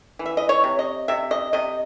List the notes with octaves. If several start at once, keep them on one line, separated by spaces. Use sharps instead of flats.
E3
E5
D#5
C#5
C3
D#5
C3 E5
D#5
C3 D#5